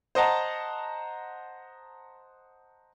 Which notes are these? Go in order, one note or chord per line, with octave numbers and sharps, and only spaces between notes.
C5 D#5 F#5 A5 A#5